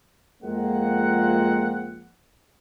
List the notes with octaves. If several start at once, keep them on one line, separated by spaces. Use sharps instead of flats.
F2 F3 G#3 A#3 C4 F#5